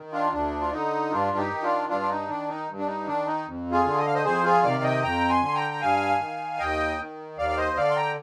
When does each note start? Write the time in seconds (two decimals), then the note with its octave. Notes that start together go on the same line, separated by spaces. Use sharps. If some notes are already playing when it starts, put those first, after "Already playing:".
Already playing: D#3
0.13 D4 F4
0.32 D2 D4
0.61 F4
0.72 D3 D#4
1.11 G2 D4 F4
1.37 D#4 G4
1.50 D#3
1.63 D4 F4
1.89 G2 D4 F4
2.01 D4
2.09 D#4
2.29 D#3 D4
2.49 D#4
2.68 G2
2.79 D4
2.87 D#4
3.07 D#3 D4
3.26 D#4
3.47 F2
3.72 F4 G#4
3.85 D3
3.98 D#5
4.06 F5
4.14 C5 D#5
4.24 F2 G#4 C5
4.43 F4 G#4
4.63 C3 D#3 D5 F5
4.83 D#5 G5
5.02 F2 G5 A#5
5.29 G#5 C6
5.42 D3 C6
5.54 G5 A#5
5.71 A#5
5.81 G2 F5 G#5
6.20 D#3
6.59 D#2 D#5 G5
6.98 D#3
7.37 D#2 D5 F5
7.49 D5
7.57 C5 D#5
7.77 D3 D5 F5
7.90 C6
7.96 G5 A#5